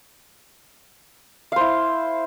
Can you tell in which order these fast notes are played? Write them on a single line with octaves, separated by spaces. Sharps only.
F5 C5 E4